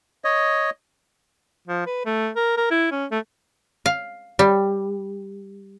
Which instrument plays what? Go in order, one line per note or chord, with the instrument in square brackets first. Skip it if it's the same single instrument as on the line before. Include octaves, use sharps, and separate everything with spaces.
[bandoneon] C#5 D#5
[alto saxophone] F3
B4
A3
A#4
A#4
E4
C#4
A3
[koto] F5
G3